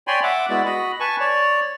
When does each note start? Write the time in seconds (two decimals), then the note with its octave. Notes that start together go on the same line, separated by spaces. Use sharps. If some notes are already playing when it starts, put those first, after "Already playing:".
0.07 C#5 D5 G5 G#5 B5 C6
0.23 E5 F#5 D6
0.50 G#3 B3 E4 F#4 D5 B5
0.65 F#4 D#5 B5
1.00 B4 G#5 A5 C#6
1.20 C#5 D5